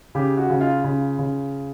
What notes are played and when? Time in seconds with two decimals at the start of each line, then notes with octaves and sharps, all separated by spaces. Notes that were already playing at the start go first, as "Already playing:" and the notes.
0.15 C#3 G4
0.37 F#4
0.50 C#3
0.61 F4
0.84 C#3 F4
1.19 C#3